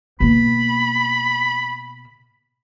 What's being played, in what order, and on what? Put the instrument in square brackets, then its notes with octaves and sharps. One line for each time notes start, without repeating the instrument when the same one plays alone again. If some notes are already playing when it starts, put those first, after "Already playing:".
[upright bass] B2 A#3 [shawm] B5